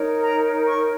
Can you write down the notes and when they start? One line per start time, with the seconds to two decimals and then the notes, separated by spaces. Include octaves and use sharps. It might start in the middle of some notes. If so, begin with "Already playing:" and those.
Already playing: D#4 A#4 C#5
0.21 A#5
0.65 C#6